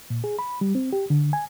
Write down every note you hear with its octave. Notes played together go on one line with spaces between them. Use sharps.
A#2
G#4
B5
G3
C4
G4
D3
G#5